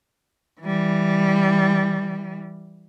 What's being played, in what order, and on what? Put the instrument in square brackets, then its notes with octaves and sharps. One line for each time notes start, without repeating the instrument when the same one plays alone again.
[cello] E3 G3